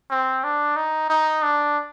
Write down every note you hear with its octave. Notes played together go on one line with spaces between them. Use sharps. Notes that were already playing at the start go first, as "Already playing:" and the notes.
C4
D4
D#4
D#4
D4